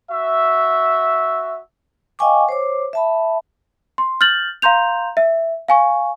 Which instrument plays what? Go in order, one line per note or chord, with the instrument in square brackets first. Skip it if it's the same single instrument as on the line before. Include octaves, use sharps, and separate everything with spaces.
[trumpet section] F#4 E5
[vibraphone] D#5 F5 G5 G#5 C#6 D6
C5 C#5 D6
E5 A5 B5
[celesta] C6
F6 G6 A6 F#7
F5 A#5 C6 G6 F7
E5
F5 G#5 C#6